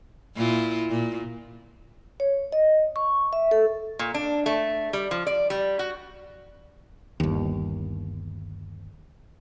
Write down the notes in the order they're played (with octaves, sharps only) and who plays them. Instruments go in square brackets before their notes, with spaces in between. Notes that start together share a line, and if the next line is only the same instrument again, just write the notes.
[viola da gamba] A#2 E4 F4
A#2
[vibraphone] C#5
D#5
C#6
E5
A4
[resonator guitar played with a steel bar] A#2
D4
A3
G3
F3
D5
G3
F#4
[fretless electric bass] G1 D#2